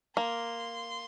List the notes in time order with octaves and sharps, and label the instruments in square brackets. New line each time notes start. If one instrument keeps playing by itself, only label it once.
[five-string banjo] A#3 [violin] C6